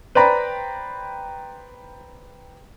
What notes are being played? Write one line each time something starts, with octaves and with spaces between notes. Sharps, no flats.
B4 C5 D5 G5 A#5 B5